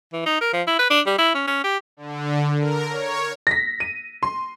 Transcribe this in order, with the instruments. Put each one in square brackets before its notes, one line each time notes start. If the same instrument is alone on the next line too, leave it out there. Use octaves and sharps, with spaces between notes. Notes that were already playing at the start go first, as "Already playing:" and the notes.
[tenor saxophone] E3
D#4
A#4
F3
E4
B4
D4
G3
E4
C#4
C#4
G4
[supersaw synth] D3
A#4
C#5
[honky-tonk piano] A#6 B6
D#7
C6